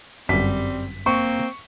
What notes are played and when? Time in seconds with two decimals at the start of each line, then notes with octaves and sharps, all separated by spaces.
0.29 G1 F#2 G3 C4 B6
1.06 A#3 C4 C#6